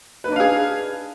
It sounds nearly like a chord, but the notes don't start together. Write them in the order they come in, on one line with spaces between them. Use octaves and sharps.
B4 D#4 D4 F5 G#4